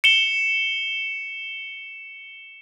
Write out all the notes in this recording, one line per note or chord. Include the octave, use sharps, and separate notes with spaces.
C#7 E7 G7